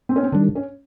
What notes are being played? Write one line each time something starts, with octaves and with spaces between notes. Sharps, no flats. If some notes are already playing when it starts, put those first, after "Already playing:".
C4
C#4
C4
D#3 G3 D4
C#4